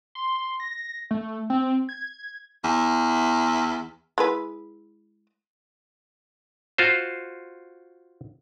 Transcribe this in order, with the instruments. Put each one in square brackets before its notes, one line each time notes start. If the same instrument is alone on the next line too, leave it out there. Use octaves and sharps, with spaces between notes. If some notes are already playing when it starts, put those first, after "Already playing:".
[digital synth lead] C6
A#6
A3
C4
G#6
[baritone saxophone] E2
[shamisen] G#3 E4 B4
[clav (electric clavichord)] F4 F#4 C5